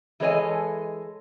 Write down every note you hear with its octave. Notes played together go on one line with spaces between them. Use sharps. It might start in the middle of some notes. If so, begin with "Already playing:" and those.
E3 G#3 A4 C#5 D#5 G#5